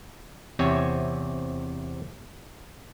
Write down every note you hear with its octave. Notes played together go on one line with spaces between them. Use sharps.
E2 C3 C4 C#5 E5 G#5